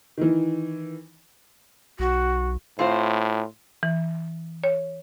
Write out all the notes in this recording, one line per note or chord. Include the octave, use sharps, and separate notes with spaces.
D#3 E3
B1 F#4
A2 C4 F4 C5
E3
C#5